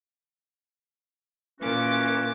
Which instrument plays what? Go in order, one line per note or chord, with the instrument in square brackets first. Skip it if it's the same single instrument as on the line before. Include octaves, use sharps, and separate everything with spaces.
[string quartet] A#2 D6 [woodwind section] E3 C#4 F#4